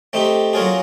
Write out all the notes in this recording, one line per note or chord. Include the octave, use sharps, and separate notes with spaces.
A3 C4 D#4 G4
F#3 A#3 C#4 F4 G#4